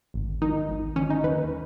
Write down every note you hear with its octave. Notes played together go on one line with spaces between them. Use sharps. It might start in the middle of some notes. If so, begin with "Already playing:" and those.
G#1
D#3 D#4
G#1
D#3 C#4
D#4
D#2 B4